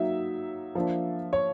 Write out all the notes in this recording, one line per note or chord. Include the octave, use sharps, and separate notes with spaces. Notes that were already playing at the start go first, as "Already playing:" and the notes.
Already playing: F#3 A#3 D#4 E5
F3 A#3 D4
C#5